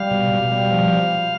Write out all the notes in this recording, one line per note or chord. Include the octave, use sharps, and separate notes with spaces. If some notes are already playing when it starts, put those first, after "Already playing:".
Already playing: G3 F5
B2
B2
G3
F3